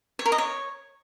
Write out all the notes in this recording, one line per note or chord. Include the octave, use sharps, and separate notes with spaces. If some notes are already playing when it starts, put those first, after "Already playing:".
C#5
A#4
D#5
C#5